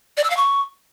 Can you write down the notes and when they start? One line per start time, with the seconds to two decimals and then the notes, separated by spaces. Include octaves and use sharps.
0.17 D5
0.24 E6
0.30 F5
0.37 C#6